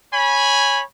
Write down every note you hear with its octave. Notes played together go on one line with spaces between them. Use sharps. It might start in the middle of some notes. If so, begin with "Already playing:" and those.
C#5 G#5 B5